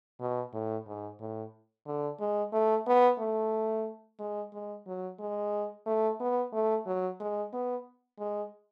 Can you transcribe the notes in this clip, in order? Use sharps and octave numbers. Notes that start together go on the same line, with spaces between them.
B2
A2
G#2
A2
D3
G#3
A3
B3
A3
G#3
G#3
F#3
G#3
A3
B3
A3
F#3
G#3
B3
G#3